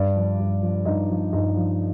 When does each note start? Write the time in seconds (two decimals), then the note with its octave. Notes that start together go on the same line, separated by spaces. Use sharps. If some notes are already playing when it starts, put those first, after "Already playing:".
Already playing: G2 D4 D5
0.16 F3
0.39 G2
0.62 F3
0.85 G2 D#4 D#5
1.09 F3
1.33 G2 D#4 D#5
1.56 F3